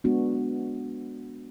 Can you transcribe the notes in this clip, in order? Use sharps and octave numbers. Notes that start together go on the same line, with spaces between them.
G#3 B3 D4 F#4